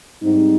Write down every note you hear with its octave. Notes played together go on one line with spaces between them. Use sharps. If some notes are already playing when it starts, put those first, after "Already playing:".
G#2 G3 C4 D#4